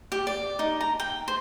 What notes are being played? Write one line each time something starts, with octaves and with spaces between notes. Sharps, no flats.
G4
D5
D#4
A#5
G5
C5